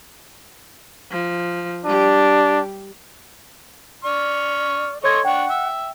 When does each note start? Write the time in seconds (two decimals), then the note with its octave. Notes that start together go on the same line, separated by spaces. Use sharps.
1.11 F3
1.85 G3 D4 G4
4.04 D5 C#6 F6
5.04 A4 C#5 D#5 C6 C#6 G#6
5.25 D4 F#5 G5 C#6
5.50 E5